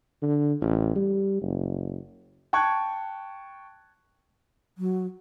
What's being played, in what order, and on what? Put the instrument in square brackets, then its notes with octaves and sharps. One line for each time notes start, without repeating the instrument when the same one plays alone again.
[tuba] D3
A1
G3
F#1
[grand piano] G5 A5 C#6 F#6 G#6
[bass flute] F#3